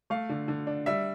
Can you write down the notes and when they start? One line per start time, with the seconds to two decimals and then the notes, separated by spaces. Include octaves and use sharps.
0.10 A3 F5
0.30 D3
0.48 D3
0.67 D4
0.86 G3 E5